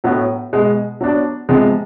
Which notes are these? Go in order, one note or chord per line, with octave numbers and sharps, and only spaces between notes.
A2 F#3 B3
B2 G#3 B3
F#3 B3 D4
C3 F3 G#3 B3